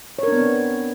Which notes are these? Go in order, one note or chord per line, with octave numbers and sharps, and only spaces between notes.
B3 C4 D4 A#4 C#5